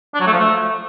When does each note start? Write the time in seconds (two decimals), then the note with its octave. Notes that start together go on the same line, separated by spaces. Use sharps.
0.14 D4
0.20 F#3
0.27 A3
0.33 F3
0.39 A3